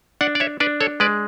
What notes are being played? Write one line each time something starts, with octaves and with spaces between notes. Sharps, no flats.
D4 D5 F#5
D5
C#5 E5
D4 B4 D5
A4 C#5
G#3 B4 D5